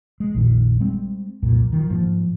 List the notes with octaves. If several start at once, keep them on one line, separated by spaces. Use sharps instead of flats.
G#3
A#1 F2 A#2 D#3
G3 G#3 C4
C2 F2 A#2
D#3 F3
G#2 F3 A#3